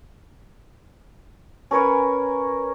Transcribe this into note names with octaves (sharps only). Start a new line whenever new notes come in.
C#4 A#4 B4 C#5